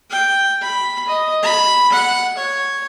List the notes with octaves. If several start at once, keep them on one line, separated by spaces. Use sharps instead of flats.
G5
B5
D#5
B5
F#5
C#5